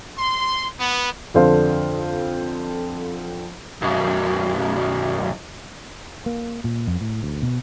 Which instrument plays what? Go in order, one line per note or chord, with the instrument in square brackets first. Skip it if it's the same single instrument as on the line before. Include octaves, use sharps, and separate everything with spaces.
[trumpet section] C6
B3
[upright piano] F2 D3 A4 C5 F5
[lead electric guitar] B1 F#2
[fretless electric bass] A#3
A#2
F2
A2
D2
B2